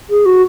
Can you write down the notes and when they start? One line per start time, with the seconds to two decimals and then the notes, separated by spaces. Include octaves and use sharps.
0.10 G#4
0.26 F#4